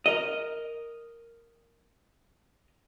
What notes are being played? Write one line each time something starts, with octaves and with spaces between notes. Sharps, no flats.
A#4 D#5